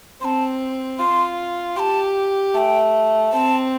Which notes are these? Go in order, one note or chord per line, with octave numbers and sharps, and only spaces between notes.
C4 A5 C6
F4 C6
G4 A5 C6
A3 G5 A5
C4 A5